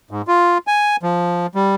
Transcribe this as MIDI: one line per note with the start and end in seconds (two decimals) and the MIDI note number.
0.11 0.22 44
0.28 0.58 65
0.67 0.96 80
1.03 1.47 53
1.55 1.75 55